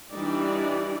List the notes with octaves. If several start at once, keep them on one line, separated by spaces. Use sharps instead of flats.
E3 G3 D4 D#4 G4 D5